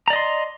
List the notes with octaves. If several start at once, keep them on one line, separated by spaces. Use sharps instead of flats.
D5 D#5 A#5 C6